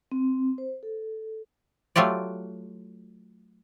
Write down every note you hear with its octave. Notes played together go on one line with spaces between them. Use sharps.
C4
C5
A4
F#3 A3 F4 G4 D5